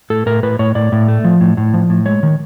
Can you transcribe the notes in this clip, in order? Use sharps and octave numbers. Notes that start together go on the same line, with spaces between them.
A2 A4
A2 A#4
A2 B4
A2 C#5
A2 D5
A2
A3
F3
A2
A2
F3
A2
G#3 C#5
D#3